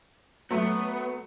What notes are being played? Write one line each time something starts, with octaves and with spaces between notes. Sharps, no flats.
F#3 A3 B3